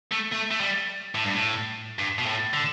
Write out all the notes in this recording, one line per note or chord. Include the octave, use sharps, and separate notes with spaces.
A3
A3
A3
G3
A2
G2
A2
G2
B2
A2
D3